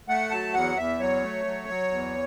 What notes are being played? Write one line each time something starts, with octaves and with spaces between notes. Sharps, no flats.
A3 F#5
F#3 A5
E2 F#5
E2 E5
F#3 C#5
A3
F#3
F#3
E2